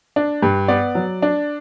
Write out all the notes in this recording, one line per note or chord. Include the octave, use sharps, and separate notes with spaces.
D4
G2
B3 D5
F#3
D4